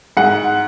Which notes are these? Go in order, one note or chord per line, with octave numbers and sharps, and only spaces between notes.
G#2 F#5